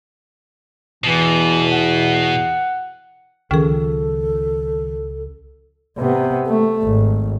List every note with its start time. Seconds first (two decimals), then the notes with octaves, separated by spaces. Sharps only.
1.04 E2 B2 E3
1.71 F#5
3.51 C#2 D#3 F3 C#4 G#4 A4
5.98 C3 B3
6.47 A3
6.84 G#1